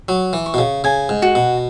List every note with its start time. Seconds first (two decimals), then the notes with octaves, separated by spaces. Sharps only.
0.08 F#3 C#6
0.33 E3
0.46 C#6
0.54 B2
0.58 C#3
0.84 C#3 G#5
1.09 G#2
1.22 F#4
1.35 B2